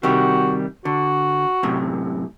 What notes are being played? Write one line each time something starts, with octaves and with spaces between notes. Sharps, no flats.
C3 D#3 G3 F#4
D3 F#4
F#2 A2 C3